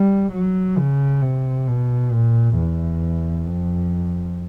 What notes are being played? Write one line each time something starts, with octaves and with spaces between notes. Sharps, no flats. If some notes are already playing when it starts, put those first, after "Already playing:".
Already playing: G3
F#3
C#3
C3
B2
A#2
E2
F2